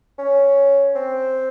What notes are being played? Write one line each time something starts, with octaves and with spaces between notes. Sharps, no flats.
C#4
C4